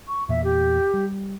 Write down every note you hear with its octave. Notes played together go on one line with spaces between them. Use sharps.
C#6
E2 A#2 A#3 E5
G4
G3